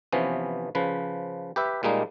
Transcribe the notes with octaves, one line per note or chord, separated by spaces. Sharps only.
C3 E3 F3 B3 C#4
C#3 F3 B4
G4 B4 E5
A#2 G3 G#3 A#3 D#4